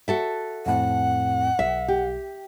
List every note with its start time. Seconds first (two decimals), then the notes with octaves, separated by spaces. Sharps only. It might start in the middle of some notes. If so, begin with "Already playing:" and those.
0.08 F#4 A4 E5
0.66 F2 A2 C4 F#5
1.59 B1 E5
1.88 G4